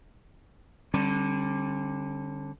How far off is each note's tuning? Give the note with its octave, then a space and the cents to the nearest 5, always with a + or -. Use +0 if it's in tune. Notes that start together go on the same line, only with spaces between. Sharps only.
D3 +0 G3 +0 C#4 -45